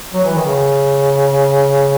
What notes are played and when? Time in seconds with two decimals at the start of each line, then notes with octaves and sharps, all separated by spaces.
0.14 F#3
0.24 E3
0.35 D#3
0.45 C#3